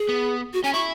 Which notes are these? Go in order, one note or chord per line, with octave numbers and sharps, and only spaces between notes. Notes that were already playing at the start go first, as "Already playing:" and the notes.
Already playing: G#4
B3
F#4
C#4 G#5
E4 C#6